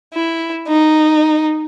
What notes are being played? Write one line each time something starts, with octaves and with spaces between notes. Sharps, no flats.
E4
D#4